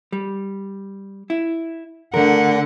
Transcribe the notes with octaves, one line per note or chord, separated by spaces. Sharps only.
G3
E4
D3 A3 A#4 F#5